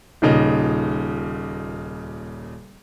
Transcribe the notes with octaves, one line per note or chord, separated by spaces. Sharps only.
D#1 A#2 C#3 D#4